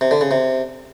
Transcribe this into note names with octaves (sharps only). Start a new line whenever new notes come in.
C3
D3
C#3
C3